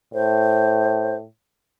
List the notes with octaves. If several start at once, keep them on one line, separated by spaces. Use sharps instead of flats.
A2 C5